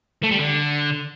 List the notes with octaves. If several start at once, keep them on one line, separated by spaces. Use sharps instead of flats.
A3
G3
D3